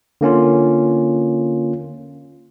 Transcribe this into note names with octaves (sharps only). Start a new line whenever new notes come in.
D3 A#3 C#4 F4